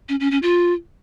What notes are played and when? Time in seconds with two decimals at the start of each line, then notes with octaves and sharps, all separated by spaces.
0.09 C#4
0.20 C#4
0.31 C#4
0.43 F4